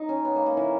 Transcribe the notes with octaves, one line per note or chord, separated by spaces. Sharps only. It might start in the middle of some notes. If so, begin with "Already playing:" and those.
Already playing: D#4
C#4
B3
A#3
A#3
E3